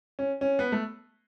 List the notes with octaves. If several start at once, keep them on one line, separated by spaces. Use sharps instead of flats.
C#4
C#4
B3
A3